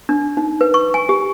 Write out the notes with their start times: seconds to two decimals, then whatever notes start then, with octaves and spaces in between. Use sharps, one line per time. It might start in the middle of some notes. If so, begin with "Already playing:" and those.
0.09 D4
0.37 D#4
0.61 B4
0.74 C#6
0.94 G#5
1.09 G4